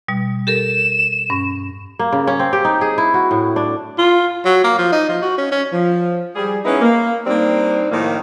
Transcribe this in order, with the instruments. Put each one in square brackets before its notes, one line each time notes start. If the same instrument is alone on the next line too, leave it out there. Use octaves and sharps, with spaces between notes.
[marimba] B2 G3
[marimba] G4 A4 A#4 [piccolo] E7
[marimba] G2 C#4
[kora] A#3
C#3
C#4
C4
G4
D#4
G#4
E4
F#4
A2
D4
[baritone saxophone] F4
[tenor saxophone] F#3
A#3
F3
D#4
F3
F#4
C#4
C#4
[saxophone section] F3
G3 G#4
B3 C#4 D#4 E4 G#4 B4
A#3
G3 A#3 C4 D4 D#4
A2 D#3 F3 A#3